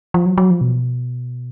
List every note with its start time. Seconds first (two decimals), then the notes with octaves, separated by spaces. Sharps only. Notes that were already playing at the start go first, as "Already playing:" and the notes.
0.14 F3
0.26 F#3
0.38 F#3
0.51 F3
0.61 B2